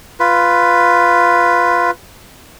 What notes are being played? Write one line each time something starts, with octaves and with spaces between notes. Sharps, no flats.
F4 B4